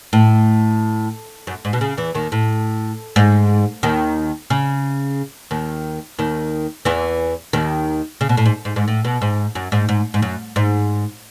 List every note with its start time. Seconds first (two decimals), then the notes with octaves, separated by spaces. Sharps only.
0.13 A2
1.47 F#2
1.65 G#2
1.73 B2
1.81 C#3
1.97 E2 E3
2.14 D#2 D#3
2.32 A2
3.16 G#2
3.83 D#2 D#3
4.50 C#3
5.51 D#2 D#3
6.18 D#2 D#3
6.85 E2 E3
7.53 D#2 D#3
8.21 C#3
8.29 B2
8.37 A2
8.45 G#2
8.65 G#2
8.76 G#2
8.88 A2
9.05 B2
9.22 G#2
9.55 F#2
9.72 G#2
9.89 G#2
10.14 G#2
10.22 F#2
10.56 G#2